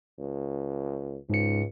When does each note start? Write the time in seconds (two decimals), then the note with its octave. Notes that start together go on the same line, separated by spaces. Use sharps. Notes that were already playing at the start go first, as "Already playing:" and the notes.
0.19 C#2
1.30 C#2 G#2 C#7